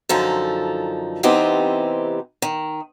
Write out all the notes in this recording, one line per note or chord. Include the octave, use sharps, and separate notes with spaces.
F#2 D3 F3 D#4 A4
C3 E3 B3 C4 D#4 G4
D#3